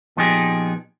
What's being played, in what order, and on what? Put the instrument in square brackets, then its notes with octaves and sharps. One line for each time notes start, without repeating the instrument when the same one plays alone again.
[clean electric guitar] A#2 F3 B3 D#4 G4 G#4